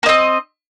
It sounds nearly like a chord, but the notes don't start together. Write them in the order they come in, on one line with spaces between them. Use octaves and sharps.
A#3 D#5 C4